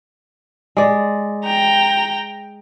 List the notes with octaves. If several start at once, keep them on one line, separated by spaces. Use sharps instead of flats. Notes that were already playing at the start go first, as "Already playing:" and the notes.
G#3 D5
G5 A#5